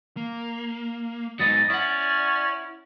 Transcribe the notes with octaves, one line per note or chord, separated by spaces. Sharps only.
A#3
G#2 F#3 B3 D#4 D#5 A6
C#4 E4 D5 F#5